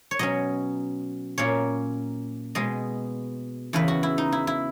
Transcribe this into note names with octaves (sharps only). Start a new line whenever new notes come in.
C#5
B2 F#3 C#4 D#5
A#2 A#3 C#4 C#5
B2 G#3 B3 D#5
E2 C#3 E3 B4
F#4
E4
D#4
E4
E4